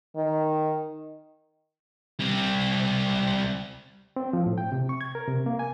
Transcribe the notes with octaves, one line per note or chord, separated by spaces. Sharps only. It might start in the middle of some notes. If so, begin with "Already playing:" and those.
D#3
G3 C4
C4
F3
A2
G5
C3
C#6
G#6
A#4
C3
A#3
G#5